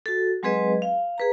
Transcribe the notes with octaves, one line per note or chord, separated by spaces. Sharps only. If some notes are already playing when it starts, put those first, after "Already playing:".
F#4 A4
F#3 G#3 C4 G#4 B4 D#5
F5
G#4 B4 A#5